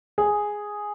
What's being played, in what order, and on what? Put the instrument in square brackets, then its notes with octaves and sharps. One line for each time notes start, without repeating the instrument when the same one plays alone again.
[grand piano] G#4